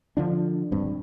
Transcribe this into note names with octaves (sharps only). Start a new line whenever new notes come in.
D3 F3 D4
D#1 G2 C4